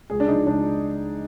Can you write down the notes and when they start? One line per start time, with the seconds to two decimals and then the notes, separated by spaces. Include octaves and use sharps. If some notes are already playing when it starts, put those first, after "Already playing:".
0.10 C#2 G#4
0.20 D4
0.28 C#3 F3 D#4
0.47 C#2 D4